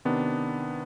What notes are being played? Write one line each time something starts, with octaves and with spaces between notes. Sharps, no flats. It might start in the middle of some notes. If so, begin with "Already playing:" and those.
C3 D#3 B3 D4